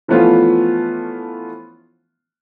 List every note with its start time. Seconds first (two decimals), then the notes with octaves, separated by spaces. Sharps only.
0.08 E3 F3 A3 B3 C#4 F4